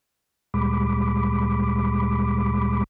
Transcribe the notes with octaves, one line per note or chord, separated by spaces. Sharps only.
D2 A#2 G3 G#3 B5 D6